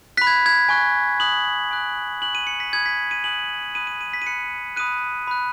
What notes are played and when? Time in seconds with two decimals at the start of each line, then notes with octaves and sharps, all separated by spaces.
0.17 B5 F#6 B6
0.27 G#6
0.46 G#6
0.69 G#5 C#6 F#6
1.20 B5 D#6 F#6 F#7
1.71 G#5 D#6 F#6
2.21 G#5 C#6 F#6 F#7
2.35 D#7
2.47 C#7
2.60 B6
2.73 G#5 B5 D#6 F#6 G#6
2.86 B6
3.11 D#7
3.24 G#5 D#6 F#6 F#7
3.75 B5 D#6 F#6 D#7
3.87 D#7
4.01 D#7
4.14 B6
4.22 D#7
4.27 B5 F#6 C#7
4.76 B5 D#6 F#6 D#7
5.27 B5 F#6